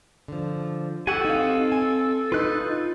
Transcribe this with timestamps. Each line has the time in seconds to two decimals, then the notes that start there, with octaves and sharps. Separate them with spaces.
0.28 D3 F3
1.07 F#4 G4 A4 F#5 G#5
1.25 C4 D#4 F5
1.72 G#5
2.32 D#4 F4 B4 F#6 G6